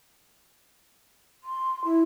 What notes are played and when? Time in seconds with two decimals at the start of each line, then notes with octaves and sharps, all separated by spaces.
1.44 C6
1.85 E4